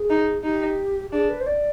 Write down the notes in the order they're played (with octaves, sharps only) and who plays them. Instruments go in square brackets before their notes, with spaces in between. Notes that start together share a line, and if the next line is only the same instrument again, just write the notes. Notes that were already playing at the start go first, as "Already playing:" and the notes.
Already playing: [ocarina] G#4
[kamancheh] D#4
[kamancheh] D#4 [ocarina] G4
[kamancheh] D4 [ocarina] G#4
[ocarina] B4
C5
D5